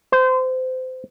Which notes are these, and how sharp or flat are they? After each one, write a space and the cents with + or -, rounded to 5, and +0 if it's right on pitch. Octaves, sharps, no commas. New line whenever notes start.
C5 -25